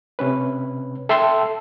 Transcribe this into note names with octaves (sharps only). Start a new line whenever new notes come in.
C3 C#4 B4
A4 E5 G5 A5 C6 E6